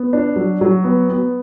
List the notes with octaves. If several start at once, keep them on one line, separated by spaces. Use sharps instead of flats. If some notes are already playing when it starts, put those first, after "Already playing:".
Already playing: B3
D4
F#3
F#3
B3
B3